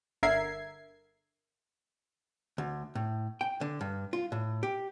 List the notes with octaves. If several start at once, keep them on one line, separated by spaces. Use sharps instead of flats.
G1 D3 A#4 E5 G#6 C7
D2
A2
G5
D3
G2
F4
A2
G4